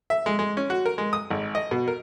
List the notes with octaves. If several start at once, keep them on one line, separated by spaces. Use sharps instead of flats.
E5
G#3
G#3
C#4
F#4
A#4
G#3
D#6
G#1
D#5
B2
A#4